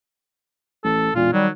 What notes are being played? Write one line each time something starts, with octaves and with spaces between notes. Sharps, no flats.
A1 A4
E1 A#2 F4
D#3 F#3 G3